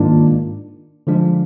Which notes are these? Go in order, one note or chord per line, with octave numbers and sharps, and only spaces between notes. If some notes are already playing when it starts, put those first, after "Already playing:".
Already playing: G#2 D#3 A#3 D4 F4
D3 F3 G#3 D4